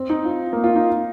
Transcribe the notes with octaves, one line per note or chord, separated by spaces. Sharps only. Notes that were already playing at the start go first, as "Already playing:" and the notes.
Already playing: C4
D#4
F4
A#3
F4
D#4